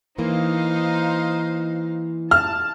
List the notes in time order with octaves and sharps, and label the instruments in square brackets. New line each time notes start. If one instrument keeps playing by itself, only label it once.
[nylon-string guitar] E3 A#3 [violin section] D#4 C5 F5
[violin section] A5 [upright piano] F6